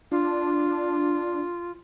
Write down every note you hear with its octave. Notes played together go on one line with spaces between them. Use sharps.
D4 F4